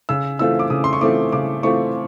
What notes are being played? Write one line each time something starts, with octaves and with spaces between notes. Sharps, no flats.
C#3 E6
E3 A3 C4 F4 E6
D6
C#3 D#6
C6
C#6
E3 A3 C4 F4 D6
C#3 D6
E3 A3 C4 F4 C#6